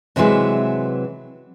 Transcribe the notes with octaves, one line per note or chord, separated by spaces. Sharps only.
A2 C3 E3 F#3 G#3 E5